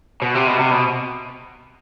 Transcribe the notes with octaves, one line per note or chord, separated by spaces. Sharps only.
B2
C3
B2
C3
B2